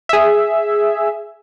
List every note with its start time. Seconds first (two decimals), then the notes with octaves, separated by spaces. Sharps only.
0.09 G#4 E5